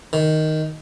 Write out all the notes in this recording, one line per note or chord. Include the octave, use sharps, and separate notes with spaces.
D#3